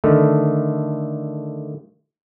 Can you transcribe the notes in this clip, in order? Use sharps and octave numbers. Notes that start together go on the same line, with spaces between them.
D3 D#3 A3